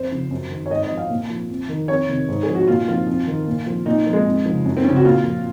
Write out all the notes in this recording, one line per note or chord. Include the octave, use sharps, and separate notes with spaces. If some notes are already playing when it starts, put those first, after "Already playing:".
Already playing: F2 C5
C#3 F3
F#2
D#3
C#5
G#2 D#5
D#5
F3
F5
A#2
F3
F2
D#3
F2 C#5
C3 D#3
G#2
G#4
F3
F#4
A#2 F4
F3 F4
F2
D#3
A#2
F3
A#2 D#4
F3
G#3
F2
C#3 F3
F#2
C4
C#3 F3 C#4
F#4
A#2 F4
F3